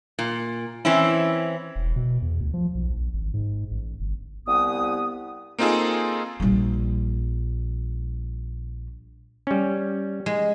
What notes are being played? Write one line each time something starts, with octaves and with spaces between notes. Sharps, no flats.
A#2
E3 C4 C#4 E4
E1
B2
E2
D2
F3
B1
A#1
G#1
G#2
A1
G1
C2 B3 G4 D#6
A#3 C4 D#4 F4 G#4 A4
A#1 G3
G3 C#4
G#3